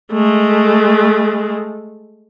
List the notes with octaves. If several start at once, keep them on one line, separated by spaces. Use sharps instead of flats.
G#3 A3